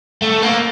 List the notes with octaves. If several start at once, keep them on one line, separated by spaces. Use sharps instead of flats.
A3
A#3